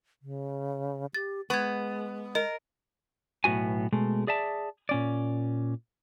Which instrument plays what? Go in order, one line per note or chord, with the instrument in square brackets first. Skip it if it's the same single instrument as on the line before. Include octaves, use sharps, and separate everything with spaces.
[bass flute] C#3
[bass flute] G4 [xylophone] A6
[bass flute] G#3 [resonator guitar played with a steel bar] B3 [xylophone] C#6 G#6
[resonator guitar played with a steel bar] A#4 [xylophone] D#5
[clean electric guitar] B1 A2 B3 F#4 G#5
B2 G#3 A3
G#4 D5 E5 A5
A#2 C#4 D5